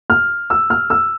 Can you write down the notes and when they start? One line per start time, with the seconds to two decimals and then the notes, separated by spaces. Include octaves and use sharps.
0.10 F6
0.50 E6
0.70 F6
0.90 E6